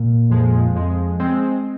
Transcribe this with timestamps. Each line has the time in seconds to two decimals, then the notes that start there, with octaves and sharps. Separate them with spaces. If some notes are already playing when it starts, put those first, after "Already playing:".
Already playing: A#2
0.30 F2 F3 G#3
0.75 F2 F3 G#3
1.20 G#3 C4